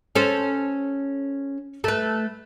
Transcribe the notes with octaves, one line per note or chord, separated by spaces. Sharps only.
C#4 A4 C5
A3 B4